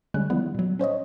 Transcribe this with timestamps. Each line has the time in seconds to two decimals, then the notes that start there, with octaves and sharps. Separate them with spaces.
0.14 D3 G3 G#3 C#4 F#6
0.30 D#3 F3 G3 B3 E4
0.55 A#2 F#3
0.79 C#4 C5 C#5 D#5